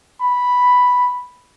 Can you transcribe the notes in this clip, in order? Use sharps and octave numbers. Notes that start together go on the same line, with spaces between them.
B5